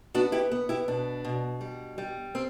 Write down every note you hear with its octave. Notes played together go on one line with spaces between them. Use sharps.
B3 D4 F#4
E4 G4
B3
E4 G4
B2 D4
B2
G3
G3
C4